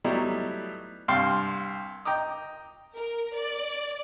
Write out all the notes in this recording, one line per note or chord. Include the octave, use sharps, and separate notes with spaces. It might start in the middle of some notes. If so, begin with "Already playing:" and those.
F#3 G3 A3 B3 D#4 E4
C2 G2 F5 G5 C6
D#5 G5 A#5 D6 D#6
A#4
D5